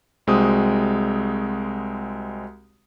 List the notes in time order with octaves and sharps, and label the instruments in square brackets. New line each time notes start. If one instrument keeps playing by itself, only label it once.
[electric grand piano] C2 G#3 C4 F#4 D#6